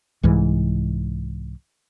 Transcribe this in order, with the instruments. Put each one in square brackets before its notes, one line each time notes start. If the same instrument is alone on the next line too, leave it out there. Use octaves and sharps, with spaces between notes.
[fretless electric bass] C2 G#2 E3